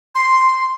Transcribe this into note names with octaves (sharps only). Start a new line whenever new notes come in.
C6